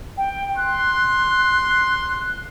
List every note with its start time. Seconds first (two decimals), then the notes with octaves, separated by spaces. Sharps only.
0.17 G5
0.57 C6 F#6